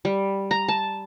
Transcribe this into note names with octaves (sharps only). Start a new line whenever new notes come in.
G3
A#5
A5